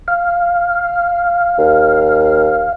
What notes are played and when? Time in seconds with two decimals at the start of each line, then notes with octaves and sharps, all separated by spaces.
0.08 F5
1.58 D#2